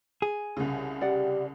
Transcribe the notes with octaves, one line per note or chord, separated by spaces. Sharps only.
G#4
C2 C#3
G4 D5 F#5